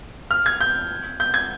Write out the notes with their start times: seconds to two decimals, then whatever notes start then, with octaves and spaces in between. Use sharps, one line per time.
0.31 F6
0.46 G#6
0.61 G6
1.20 G6
1.34 G#6